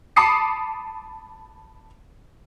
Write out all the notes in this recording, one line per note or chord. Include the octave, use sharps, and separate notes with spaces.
A5 B5 D6 D#6 C7 C#7